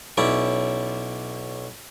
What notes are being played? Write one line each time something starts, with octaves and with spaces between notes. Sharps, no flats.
B1 C#4 E4 D5